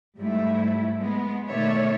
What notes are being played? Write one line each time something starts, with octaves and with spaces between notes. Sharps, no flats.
G#2 G3 A3 E4
G#3 B3
B2 D#3 A3 C#5 D5 E5